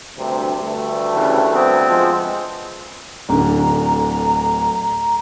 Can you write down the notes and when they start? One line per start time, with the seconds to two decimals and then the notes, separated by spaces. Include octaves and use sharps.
0.18 D2 G2 C3
0.61 D2 G2 A3
1.16 C#3 E3 G3
1.54 B3 C4
1.90 F3 G#3
3.29 D1 D3 A#5